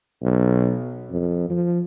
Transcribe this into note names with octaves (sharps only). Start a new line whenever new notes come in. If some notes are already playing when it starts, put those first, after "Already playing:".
B1
F2
F3